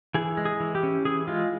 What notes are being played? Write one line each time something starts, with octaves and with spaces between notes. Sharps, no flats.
E3 G#4
G#3
G#4
E3
G4
C#4
E3 G#4
G#3 F4